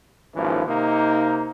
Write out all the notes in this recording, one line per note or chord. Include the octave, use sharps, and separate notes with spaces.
G#1 D#2 E3 F3 C#4
C3 A#3 D#4